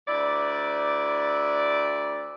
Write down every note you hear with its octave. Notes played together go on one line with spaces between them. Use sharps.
D2 E4 D5